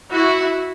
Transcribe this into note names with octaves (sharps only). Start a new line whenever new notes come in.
E4 F#4